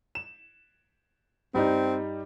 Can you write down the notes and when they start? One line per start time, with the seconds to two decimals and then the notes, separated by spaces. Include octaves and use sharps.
0.15 E7
1.54 G2 G3 C4 D#4